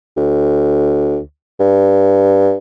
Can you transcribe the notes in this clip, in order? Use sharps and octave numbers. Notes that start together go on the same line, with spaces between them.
D2
G2